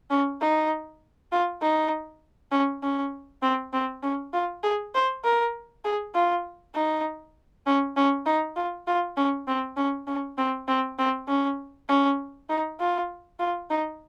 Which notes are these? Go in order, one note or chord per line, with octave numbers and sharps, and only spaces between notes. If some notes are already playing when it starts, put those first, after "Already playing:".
C#4
D#4
F4
D#4
C#4
C#4
C4
C4
C#4
F4
G#4
C5
A#4
G#4
F4
D#4
C#4
C#4
D#4
F4
F4
C#4
C4
C#4
C#4
C4
C4
C4
C#4
C#4
D#4
F4
F4
D#4